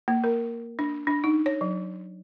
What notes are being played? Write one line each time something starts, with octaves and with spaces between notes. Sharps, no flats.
A#3
A#4
D4
D4
D#4
C#5
F#3